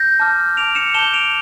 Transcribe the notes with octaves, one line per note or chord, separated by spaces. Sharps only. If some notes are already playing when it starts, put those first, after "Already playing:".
Already playing: G6 A#6
A5 D6 F6
A5 D6 G6 D7 F7
C#7 E7
A5 D6 G6 E7 G7
D7 F7